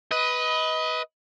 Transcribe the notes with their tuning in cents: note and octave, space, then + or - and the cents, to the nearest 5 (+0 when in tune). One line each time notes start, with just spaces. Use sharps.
B4 +0 D#5 +25